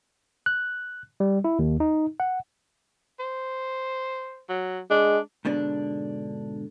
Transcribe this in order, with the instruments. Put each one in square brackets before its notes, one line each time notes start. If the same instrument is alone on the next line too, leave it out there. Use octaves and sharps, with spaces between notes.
[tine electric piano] F#6
G3
E4
D#2
D#4
F#5
[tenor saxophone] C5
F#3
[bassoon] G#3 [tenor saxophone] D4
[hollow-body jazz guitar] G#2 B2 D3 D4